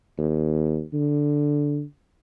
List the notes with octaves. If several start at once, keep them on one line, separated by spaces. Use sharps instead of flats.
D#2
D3